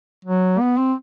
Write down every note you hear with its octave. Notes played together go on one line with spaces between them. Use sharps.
F#3
B3
C4